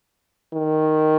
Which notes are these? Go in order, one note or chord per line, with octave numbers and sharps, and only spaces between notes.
D#3